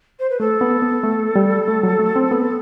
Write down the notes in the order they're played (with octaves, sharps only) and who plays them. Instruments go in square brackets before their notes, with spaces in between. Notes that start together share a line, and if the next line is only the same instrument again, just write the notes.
[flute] C5
B4
[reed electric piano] A3 [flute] A4
[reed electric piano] B3
B3
A3
G3
A3
F#3
A3
C4
B3